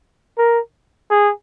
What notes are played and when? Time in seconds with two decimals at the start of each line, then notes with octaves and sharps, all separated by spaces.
0.38 A#4
1.10 G#4